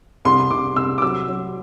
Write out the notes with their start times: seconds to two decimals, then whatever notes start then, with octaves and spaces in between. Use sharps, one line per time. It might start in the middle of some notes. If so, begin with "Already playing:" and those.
0.25 C2 C6
0.50 C2 D6
0.76 C2 E6
0.98 D6
1.02 F#3 E6
1.29 F#3